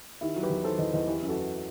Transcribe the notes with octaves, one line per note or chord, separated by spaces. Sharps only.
D#3 E4 G4
F#3
G4 B4
E2
D#3 A4 C5
E2 B4 D#5
E2 B4 D#5
E3 G4 B4
F#2
F#4 A4
E3